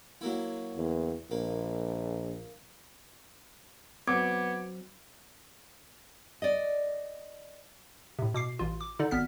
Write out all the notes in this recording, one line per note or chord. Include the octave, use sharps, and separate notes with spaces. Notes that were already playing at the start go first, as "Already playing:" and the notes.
F#3 A#3 E4
E2
A#1 A#3
F#3 B3 C4 D6 G#6
D5 D#5
A2 C3
B2 D6 C7
A1 F4
D6
D3 D#4 D5
G#1 B3 F6 B6